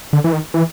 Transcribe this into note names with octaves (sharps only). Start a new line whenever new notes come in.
D3
E3
D#3
E3